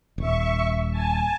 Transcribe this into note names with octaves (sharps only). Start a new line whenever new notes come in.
D#1 E5 C#6
G#5 A5